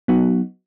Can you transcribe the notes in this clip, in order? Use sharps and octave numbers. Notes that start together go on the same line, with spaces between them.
F#3 B3 D#4 F#4